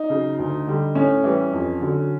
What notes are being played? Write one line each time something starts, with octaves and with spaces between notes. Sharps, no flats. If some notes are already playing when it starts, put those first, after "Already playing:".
Already playing: D#4
C#3 F#3
D2
D3 G3
A2 C#4
E3 G3
F2
D3 F#3